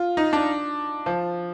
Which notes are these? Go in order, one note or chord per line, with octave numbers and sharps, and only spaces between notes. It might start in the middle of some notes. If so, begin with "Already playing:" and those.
Already playing: F4
D#4
D4
F3